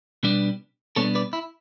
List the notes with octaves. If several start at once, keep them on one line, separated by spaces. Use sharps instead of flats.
B2 G3 B3 D4
B2 G3 B3 D4 A4 C#5
B4 D5
E4